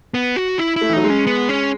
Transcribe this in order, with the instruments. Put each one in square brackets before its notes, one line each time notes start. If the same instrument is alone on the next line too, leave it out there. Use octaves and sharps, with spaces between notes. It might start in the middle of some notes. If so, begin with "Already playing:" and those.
[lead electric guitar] B3
F#4
E4
E4
[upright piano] A3
E3
[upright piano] F#3 [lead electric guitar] D#4
[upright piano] G#3
[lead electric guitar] C#4
B3
C#4